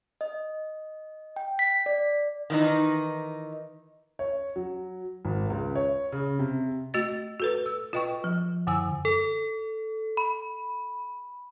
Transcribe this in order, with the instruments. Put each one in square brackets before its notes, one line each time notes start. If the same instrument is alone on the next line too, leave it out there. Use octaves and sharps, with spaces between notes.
[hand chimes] D#5
G5
B6
D5
[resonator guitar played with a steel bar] D#3 E3 D#4
[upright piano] C#5
F#3
G#1
C#2
C#5
C#3
C3
[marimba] A3 F#4 D#5 A6
F#4 A4 B4
E6
F4 B4 D#5 G5 C#6
F3
F#2 D3 G#5 E6
[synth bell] A4
B5